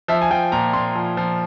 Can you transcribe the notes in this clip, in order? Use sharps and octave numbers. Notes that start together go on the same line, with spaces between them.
F3 E5
G#5
F3 G5
A#2 A#5
A#2 C6
F3
F3